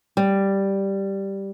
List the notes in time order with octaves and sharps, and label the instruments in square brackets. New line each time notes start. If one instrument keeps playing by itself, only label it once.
[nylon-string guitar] G3